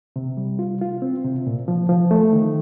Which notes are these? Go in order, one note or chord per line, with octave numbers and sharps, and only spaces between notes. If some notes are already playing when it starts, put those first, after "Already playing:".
C3
G3
F4
F4
C4
C3
A#2
F3
F3
A3
D#3